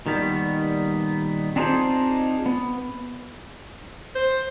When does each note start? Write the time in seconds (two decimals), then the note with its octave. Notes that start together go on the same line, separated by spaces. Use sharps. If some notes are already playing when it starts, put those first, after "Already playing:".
0.06 A#2 D#3 G3 B3
1.56 C4 D4 D#4 F4 G#4 C5
2.46 B3
4.15 C5